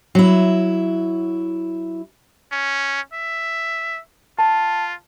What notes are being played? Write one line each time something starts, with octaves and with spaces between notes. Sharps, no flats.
F#3 E4
C#4
E5
F4 A5